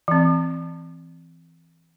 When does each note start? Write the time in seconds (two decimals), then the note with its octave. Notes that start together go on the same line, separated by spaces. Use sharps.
0.08 E3 C4